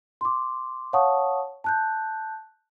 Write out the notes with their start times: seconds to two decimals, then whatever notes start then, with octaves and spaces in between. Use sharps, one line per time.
0.21 C6 D6
0.93 C#5 F5 F#5 A5 C#6 D#6
1.64 A5 F#6 G6